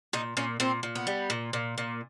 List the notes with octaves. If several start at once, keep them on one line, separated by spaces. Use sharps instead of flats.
A#2 D#4
A#2 C#4
A#2 C4
A#2
B3
G3
A#2
A#2
A#2